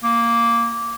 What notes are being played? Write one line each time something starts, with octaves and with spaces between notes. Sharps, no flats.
A#3